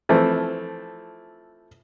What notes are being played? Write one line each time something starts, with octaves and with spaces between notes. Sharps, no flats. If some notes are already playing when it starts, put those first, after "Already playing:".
E3 F3 A3 C4